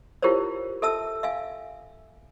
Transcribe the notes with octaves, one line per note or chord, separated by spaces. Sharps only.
E4 F4 G4 A#4 C5 C#5
A4 E5 A5 E6
E5 F5 G#5